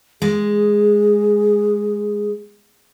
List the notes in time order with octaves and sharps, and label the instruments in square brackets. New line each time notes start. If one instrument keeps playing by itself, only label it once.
[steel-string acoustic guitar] G#3 [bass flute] G#4